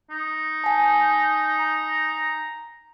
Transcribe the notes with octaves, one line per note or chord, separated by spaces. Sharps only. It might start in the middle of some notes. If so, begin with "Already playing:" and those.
D#4
G#5 A5
A#5